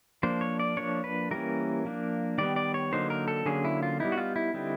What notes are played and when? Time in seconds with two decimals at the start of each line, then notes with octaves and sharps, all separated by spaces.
0.23 F3 A#3 D4 C5
0.41 C#5
0.60 D5
0.77 F3 A#3 D4 C#5
1.04 B4
1.31 E3 G3 A#3 C#4 A#4
1.85 F3 A#3 D4
2.38 D#3 G3 B3 D5
2.56 D5
2.74 C#5
2.92 D3 F#3 A#3 D#4 C5
3.10 A#4
3.28 A4
3.46 D3 F#3 A#3 C#4 G#4
3.65 E4
3.83 F4
4.00 G3 B3 D#4 E4
4.12 F#4
4.18 F4
4.36 E4
4.54 D3 G3 C4 D#4